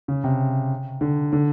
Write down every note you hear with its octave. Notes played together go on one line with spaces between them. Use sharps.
C#3
C3
D3
D3